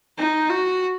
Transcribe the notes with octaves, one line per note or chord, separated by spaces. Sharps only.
D#4
F#4